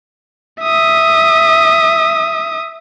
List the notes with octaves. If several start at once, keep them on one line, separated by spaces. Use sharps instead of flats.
E5 D#6